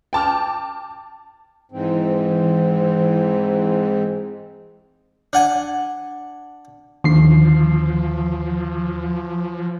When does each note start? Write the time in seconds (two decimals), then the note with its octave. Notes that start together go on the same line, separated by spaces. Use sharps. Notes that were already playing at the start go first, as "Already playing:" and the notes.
0.13 G5 A5 D6 F6
1.72 G#2 E3 C4
5.33 D4 F#5 G#5
7.04 D#2 D3 F3 C7